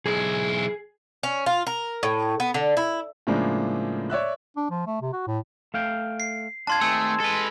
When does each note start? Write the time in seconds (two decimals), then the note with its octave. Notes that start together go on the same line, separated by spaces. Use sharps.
0.06 B1 E4 G#4
1.23 C#4
1.46 F4
1.67 A#4
2.03 A2
2.40 B3
2.54 D3
2.77 E4
3.27 A2 C#3 F3 G#3 A#3 D4
4.10 C#5 D5 E5 F#6
4.56 D4
4.70 F3
4.86 A3
5.02 C3
5.13 F#4
5.27 A2
5.74 A3 F5 G5
6.20 C7
6.67 D4 F4 A5 C6 G#6
6.81 D#3 A3 C4 G#4 E6
7.20 G#3 A4 B4